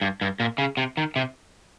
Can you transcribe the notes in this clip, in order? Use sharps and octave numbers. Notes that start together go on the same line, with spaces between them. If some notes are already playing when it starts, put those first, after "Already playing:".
G2
G2
A#2
C#3
C3
D#3
C3